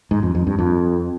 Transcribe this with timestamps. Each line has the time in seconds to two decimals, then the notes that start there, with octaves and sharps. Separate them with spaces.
0.11 G#2
0.23 F2
0.35 F2
0.47 G2
0.59 F2